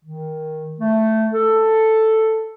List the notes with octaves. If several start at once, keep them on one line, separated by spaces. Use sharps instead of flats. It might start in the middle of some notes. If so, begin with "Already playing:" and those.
D#3
A3
A4